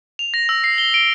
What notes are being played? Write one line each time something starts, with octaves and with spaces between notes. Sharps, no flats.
F7
A#6
E6
C7
G7
D7